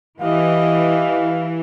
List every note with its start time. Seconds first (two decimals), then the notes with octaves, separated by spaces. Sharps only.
0.21 E3 G4 D#5 F5